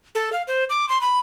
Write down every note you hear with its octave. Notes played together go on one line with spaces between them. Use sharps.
A4
F5
C5
D6
C6
B5